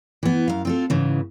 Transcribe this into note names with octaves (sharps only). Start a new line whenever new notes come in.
E3 B3
F#2 F5
C4 F4 A4
G#2 C#3 E3